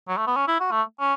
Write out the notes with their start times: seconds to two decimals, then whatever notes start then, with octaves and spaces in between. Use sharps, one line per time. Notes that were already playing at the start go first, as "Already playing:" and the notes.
0.08 F#3
0.17 A3
0.27 B3
0.36 C#4
0.48 E4
0.60 F#4
0.71 A3
1.00 C#4